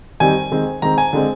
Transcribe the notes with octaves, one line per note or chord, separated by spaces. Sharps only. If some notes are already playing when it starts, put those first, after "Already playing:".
D#3 G3 C4 G#5
D#3 G#3 C4
D#3 G#3 C4 A#5
G#5
D3 G#3 C4